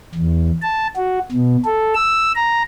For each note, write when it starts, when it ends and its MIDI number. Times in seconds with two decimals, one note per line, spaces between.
0.15 0.51 40
0.62 0.87 81
0.97 1.19 66
1.31 1.56 47
1.65 1.94 69
1.95 2.32 88
2.35 2.62 82